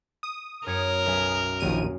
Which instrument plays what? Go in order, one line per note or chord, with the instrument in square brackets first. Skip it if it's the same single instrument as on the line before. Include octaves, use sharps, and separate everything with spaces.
[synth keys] D#6
[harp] F#2 G#6 C#7 [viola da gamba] A#4
[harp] B1 E5 G#5
[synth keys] A#1 D#2 D#7